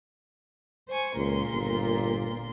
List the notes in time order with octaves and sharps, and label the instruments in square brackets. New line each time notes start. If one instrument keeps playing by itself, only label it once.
[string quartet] C5 G#5 C#6
[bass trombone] C#2 [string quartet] A#2 A#4 C6
[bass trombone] G1